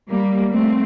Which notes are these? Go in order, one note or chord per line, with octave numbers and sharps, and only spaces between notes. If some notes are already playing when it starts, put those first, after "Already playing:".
G3 A#3
A3 C4